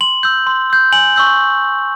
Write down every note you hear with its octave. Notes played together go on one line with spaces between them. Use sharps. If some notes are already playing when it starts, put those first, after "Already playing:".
C6 F#7
E6 G6
C6
E6 G6
G#5 F#7
C#6 E6 G6